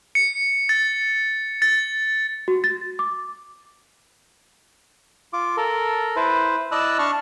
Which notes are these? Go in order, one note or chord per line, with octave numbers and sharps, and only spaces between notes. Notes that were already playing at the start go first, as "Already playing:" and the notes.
C#7
A6
A6
F#4
A6
D6
F4 D6
A4 A#4
E4 B4 C5
E4 D5 D#5 A5 E6 F#6
D4 A5 C#6 F6